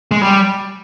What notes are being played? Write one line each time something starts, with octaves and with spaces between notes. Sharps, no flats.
G#3
G3